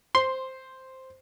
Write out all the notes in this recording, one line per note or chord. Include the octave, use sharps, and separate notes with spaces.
C5 C6